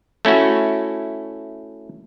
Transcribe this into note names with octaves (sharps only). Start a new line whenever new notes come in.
A3 C#4 E4 F#4